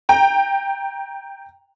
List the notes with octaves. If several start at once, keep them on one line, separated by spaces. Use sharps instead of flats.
G5 A#5